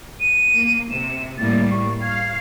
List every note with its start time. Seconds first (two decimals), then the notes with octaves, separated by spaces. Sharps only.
0.20 D#7
0.52 A#3
0.90 C3 E7
1.38 A2 G3 A#3 A6
1.71 C#6
2.01 F5 G#6